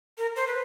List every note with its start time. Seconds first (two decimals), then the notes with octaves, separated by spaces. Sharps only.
0.18 A#4
0.36 C5
0.47 B4